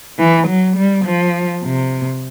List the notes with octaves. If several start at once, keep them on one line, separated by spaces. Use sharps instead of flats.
E3
F#3
G3
F3
C3